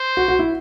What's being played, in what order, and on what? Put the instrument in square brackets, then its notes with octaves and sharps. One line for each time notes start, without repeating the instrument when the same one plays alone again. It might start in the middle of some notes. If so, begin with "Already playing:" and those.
Already playing: [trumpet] C5
[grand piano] F#4
F#4
E4